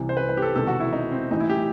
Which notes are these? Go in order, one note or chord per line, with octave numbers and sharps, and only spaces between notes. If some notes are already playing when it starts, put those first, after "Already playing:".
Already playing: C2 C3 E3
C5
B4
B4
G4
A4
E1 E2 C3 D#3 A4
F#4
E4
D#4
C4
A1 A2 E3 D#4
E4
G4